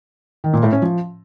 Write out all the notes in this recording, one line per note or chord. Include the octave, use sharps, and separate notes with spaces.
D#3
A#2
A2
C#4
F3